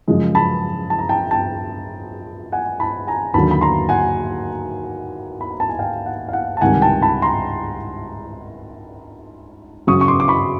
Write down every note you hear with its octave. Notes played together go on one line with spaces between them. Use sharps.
F#2 C#3 F3 G#3
A5 B5
A5
A#5
G5 A5
G5 A5
F#5 G#5
A5 B5
G#5 A#5
D#2 D3 F#3 A5 B5
B5
A#5 C6
F#5 G#5
B5
A#5
A5
G#5
F5 G5
F#5
F5
F#5
A5
C#2 C3 D#3 G3 F#5 G#5
G5 A5
A5 B5
A#5 C6
F#2 C#3 F#3 C#6 D#6
C#6
C6 D6
D6
B5 C#6